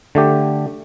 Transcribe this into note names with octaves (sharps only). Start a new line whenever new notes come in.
D3 A3 G4